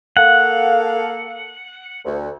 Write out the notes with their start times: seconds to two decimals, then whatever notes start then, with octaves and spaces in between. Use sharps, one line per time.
0.17 A#3 A4 F5 F#5
2.05 D2